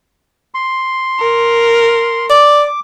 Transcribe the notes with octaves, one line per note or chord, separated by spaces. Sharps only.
C6
A#4
D5 D6